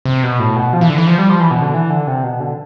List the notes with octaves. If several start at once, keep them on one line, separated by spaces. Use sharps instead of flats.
C3
B2
A2
B2
F3
E3
D3
E3
F3
G3
F3
E3
B2
D3
E3
D3
C3
B2
D3